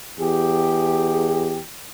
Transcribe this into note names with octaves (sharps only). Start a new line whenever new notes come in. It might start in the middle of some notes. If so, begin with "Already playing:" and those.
E2 G4 G#4